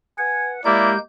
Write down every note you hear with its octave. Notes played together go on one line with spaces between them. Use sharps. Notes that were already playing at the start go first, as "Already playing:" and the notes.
B4 F#5 G#5
G#3 A#3 E4 G4 D5 G6